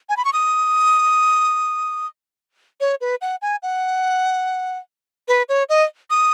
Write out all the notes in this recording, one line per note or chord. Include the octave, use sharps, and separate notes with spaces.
G#5
B5
C#6
D#6
C#5
B4
F#5
G#5
F#5
B4
C#5
D#5
D#6